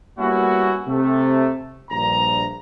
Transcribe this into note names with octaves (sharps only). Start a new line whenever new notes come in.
G3 A#3 B3 C#4 E4 F#4
C3 A3
A#1 G2 A#5